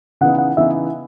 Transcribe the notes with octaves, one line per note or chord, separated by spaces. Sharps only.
C#3 E3 B3 D#4 F#5
F#5
C#3 E3 B3 D#4 E5